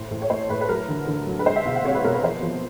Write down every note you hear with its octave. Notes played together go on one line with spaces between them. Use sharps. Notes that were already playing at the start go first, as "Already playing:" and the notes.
Already playing: A2 C5
A2
C#5
A3 C5
A2 B4
B4
F#3 A#4
D3
D3
F#3
B4
G#3 C5
E5
B2 F5
F#5
C4 C#5
B4
B2 A#4
B4
F3 C5
F3